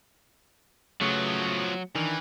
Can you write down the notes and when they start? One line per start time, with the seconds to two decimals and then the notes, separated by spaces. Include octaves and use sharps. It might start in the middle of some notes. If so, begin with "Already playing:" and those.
1.01 C#3 F3 F#3 A3 B3 C#6
1.95 D#3 E3 D4